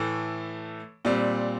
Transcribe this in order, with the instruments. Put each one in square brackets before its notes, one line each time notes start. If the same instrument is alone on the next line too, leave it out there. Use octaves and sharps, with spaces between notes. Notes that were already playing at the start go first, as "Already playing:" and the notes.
Already playing: [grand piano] A2 E3 A3
A#2 G3 C4